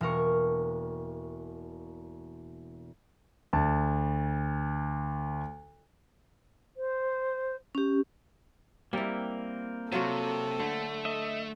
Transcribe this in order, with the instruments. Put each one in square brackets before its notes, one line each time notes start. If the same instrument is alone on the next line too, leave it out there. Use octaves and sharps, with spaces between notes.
[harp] E1 A#3 A#4 C#6
[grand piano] D2 A5
[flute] C5
[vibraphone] C#4 G4
[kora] G3 E4 [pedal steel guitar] A#3 C4 A#4
[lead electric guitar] C3 [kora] F#3 F4 F#4 [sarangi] A4
[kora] D3 [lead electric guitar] A3
[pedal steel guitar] D#5 E5